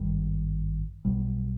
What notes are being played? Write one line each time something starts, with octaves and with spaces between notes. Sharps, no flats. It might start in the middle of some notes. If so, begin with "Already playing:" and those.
Already playing: G#1 G2 D#3 G3
B1 B2 G3